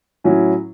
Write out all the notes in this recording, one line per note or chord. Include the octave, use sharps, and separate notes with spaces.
A2 F#3 C#4 E4